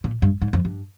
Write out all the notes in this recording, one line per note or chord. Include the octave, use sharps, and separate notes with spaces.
A#2
G2
G#2
F2
G2